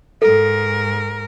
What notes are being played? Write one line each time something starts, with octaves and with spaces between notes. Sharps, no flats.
G#2 A4 A#4